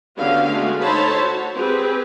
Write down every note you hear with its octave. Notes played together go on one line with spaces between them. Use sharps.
D3 B3 C#4 F#4 G4 F5
G#3 A3 F#4 G#4
D#4 A4 C5 C#5 A5 B5
F#4
C4 G4 G#4 B4